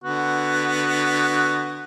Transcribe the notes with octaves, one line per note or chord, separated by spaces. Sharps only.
D3 B3 F#4